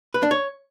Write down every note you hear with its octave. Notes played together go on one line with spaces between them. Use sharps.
B4
D4
C#5